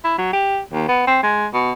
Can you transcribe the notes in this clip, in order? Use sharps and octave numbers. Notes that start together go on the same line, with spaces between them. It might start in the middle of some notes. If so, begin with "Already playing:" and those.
E4
F#3
G4
D#2
B3
C4
G#3
B2